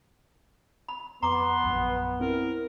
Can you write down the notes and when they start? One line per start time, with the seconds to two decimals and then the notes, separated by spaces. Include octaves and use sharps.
0.88 B5
1.23 F2 B3 A#5 C6 D6
1.64 A#1 F#2
2.20 C4 E4 A#4